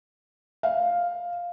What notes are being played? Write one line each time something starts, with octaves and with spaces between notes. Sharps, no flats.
F5